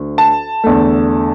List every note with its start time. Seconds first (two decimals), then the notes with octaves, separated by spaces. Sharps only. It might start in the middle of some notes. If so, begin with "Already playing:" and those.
Already playing: D2
0.18 A5
0.64 E2 D3 A3